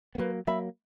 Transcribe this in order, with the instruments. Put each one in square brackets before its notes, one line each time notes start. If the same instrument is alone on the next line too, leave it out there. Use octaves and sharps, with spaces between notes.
[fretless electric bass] B3
[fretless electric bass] F#3 A#3 [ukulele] B4
[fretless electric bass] F#3 A#3 [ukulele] E5 B5